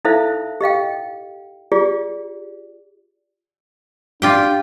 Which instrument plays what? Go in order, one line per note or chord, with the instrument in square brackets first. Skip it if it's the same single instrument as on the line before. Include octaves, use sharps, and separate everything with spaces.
[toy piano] D#4 E4 A4 C5 E5 F5
G4 D#5 F5 G5
F4 G4 G#4 D5
[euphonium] D4 [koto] F4 G4 G5